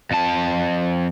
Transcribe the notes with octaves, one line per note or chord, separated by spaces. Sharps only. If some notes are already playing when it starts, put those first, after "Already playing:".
F2 A5